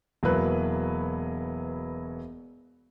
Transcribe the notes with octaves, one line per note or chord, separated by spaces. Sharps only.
E1 F#3 A#3 E4 B4 F#6